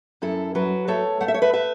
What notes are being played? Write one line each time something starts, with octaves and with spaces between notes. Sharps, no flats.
F#2 E4 A4
F#3 F#4 B4
A3 A4 C#5
A3 F#5
E5
C#5
B4 E5
B4 E5